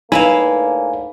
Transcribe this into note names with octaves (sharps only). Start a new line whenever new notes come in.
A2 D3 A#3 D#4 E4 B4 F5 G#5